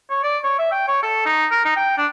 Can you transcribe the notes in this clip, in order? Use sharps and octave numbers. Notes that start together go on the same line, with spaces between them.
C#5
D5
C#5
E5
G5
C#5
A4
D#4
A#4
D#4
G5
D4